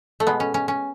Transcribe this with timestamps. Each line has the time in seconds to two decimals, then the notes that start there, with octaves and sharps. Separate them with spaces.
0.20 A3
0.27 B2 G#3 B3
0.40 C#4
0.54 C#4
0.68 C#4